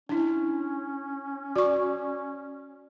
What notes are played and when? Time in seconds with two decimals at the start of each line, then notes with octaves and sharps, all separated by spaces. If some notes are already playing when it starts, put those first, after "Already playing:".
0.09 C#4 D4 E4
1.56 F#4 D5 C#6